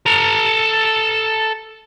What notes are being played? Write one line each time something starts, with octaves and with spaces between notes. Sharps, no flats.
A4 A#5